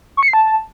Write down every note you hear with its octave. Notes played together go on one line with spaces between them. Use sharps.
C#6
C#7
C7
A5